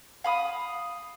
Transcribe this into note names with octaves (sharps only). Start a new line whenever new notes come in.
F5 B5 D#6